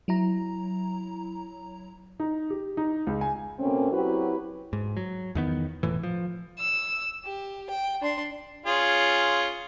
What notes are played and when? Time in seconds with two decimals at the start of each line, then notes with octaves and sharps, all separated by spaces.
0.08 F#3 E4 A#5
2.20 D#4
2.50 G4
2.77 D#4
3.07 C#2
3.21 G#5
3.59 B2 A3 A#3 C4 C#4
3.92 F#3 C4 E4 F#4 G4 B4
4.73 G#2
4.97 F#3
5.35 E2 D#3 B3
5.83 E1 A2 E3
6.03 F3
6.59 E6
7.25 G4
7.70 G5
8.01 D4 C6
8.66 C#4 F4 G#4